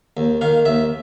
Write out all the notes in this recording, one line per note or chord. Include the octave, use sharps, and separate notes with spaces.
D#2
D#3 F5
D#2 E5